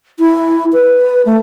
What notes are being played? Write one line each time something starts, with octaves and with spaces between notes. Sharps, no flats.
E4
B4
A3